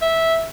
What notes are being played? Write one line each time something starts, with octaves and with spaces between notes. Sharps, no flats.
E5